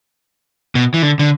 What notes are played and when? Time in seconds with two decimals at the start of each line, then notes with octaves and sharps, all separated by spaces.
0.75 B2
0.94 E3
1.02 D3
1.19 D3